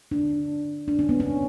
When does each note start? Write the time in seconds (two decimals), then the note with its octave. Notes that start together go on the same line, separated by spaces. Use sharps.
0.11 D4
0.88 D4
0.99 C#4
1.09 B3
1.20 C#4